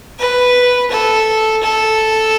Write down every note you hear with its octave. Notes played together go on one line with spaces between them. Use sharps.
B4
A4
A4